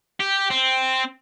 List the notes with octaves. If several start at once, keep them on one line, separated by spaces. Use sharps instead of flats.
G4
C4